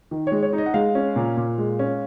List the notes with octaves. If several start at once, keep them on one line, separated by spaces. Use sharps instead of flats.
D#3
C#5
G#3
C#5
D#4
D#5
F#5
G#3 F5
C#4
A#2
A#2
G#3
C#4